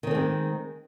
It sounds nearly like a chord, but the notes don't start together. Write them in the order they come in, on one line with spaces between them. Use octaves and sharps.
D#3 C4 A#3 G#3